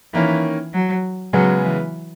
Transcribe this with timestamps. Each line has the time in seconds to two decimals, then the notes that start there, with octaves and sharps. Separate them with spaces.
0.14 D#3 E3 A#3 C#4
0.74 F#3
1.33 C#3 F#3 G#3 B3
1.64 E3